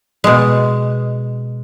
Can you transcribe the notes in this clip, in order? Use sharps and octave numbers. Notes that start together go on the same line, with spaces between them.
B2 G#3